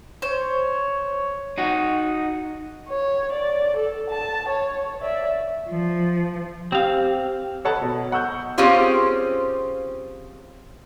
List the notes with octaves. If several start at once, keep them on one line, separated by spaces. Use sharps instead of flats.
C5 C#5
D#4 F#4
C#5
D5
A4
A5
C#5
D5 E5
F3
C4 G4 F5
A4 C#5 D#5 F#5 A5 B5
B2
D#5 F#5 C#6 E6 G6
C4 C#4 F4 G4 G#4 C5